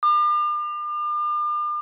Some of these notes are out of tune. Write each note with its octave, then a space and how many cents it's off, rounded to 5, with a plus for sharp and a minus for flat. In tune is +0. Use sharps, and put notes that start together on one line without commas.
D6 +40